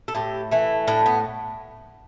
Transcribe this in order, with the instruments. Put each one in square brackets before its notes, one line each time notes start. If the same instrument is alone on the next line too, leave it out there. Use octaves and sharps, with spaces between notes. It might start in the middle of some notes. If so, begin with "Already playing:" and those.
[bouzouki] A4
A2 G4
E3 A3
A2 D4
B3